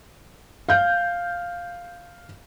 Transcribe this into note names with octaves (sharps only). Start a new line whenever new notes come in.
F5 G6